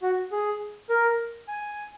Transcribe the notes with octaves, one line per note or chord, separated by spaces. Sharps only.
F#4
G#4
A#4
G#5